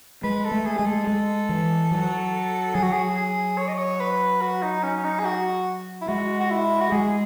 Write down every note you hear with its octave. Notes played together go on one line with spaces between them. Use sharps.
G#3 B4
A4
A3
G#4
G#3 G#4
A4
G#3
E3
F#3
F#3 G#4
F#4
G#4
G#4
C#5
D#5
C#5
B4
F#4
D#4
C#4
D#4
G#4
F#4
E4
G#3 F#4
F#4
E4
F#4
G#3 G#4